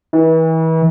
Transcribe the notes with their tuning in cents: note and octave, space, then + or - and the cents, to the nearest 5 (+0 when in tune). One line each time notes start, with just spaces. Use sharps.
E3 -35